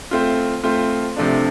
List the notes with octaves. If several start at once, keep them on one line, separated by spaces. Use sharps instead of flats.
A3 C4 F4
A3 C4 F4
C3 F3 A3 D4